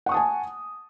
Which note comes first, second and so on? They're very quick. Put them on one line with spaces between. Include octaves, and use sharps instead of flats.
F#5 C#6 D#6 A5 G#5